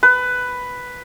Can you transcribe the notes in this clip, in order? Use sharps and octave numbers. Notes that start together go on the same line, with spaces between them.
B4